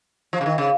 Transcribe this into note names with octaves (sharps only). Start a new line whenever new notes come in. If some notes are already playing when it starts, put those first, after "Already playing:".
F3
C#3
D#3
C#3